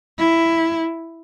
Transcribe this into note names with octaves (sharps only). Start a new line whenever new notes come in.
E4